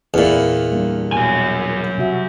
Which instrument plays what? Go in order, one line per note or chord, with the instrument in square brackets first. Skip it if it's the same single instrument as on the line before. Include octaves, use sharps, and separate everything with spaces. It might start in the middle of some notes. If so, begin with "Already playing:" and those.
[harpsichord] E2 A#2 [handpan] A#3 C4 E4
[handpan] G3 A#3 D4
[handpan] B2 A#4 [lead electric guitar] F#3 G#5
[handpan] C3 F#4 E5